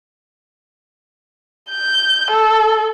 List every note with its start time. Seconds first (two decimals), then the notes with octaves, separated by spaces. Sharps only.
1.71 G6
2.30 A4